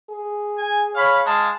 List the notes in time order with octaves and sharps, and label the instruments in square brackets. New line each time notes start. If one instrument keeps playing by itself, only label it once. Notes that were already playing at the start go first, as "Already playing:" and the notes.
[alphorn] G#4
[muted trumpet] G#5
[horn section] C#5 B5 [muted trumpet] F5
[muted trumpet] G#3 [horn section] F5 A5